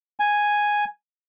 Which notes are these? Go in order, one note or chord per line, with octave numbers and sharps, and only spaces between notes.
G#5